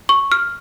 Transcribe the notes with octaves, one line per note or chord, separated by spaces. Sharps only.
C#6
F6